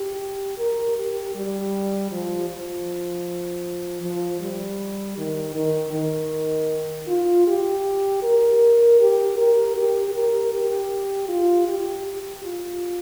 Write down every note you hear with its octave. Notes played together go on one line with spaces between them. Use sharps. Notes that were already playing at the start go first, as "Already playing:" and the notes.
Already playing: G4
A#4
G4
G3
F3
F3
F3
G3
D#3
D#3
D#3
F4
G4
A#4
G4
A#4
G4
A#4
G4
F4
G4
G4
F4